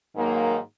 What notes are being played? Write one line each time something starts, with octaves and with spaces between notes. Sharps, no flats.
G#2 D#3 F#3 A#3